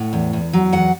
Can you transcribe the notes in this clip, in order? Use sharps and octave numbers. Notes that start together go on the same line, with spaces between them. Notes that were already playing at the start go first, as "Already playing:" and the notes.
Already playing: A2 F#5
E2
E2
F#3
E2 F#5